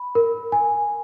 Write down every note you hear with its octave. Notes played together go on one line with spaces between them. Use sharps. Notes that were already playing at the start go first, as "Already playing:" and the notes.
Already playing: B5
A#4
G#5